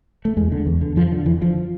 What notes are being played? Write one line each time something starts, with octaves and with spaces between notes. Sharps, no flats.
A3
E2 G#3
D3
E2
D3
F2 F3
D3
F2 E3
D3 F3